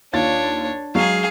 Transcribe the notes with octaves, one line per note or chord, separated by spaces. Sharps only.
D#2 D4 F4 C#5 A6
F#3 G#3 G#4 F5